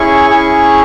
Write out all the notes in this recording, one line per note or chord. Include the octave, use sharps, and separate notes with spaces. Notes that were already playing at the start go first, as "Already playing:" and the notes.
Already playing: C#4 E4 G#4 C#6
C#4 E4 G#4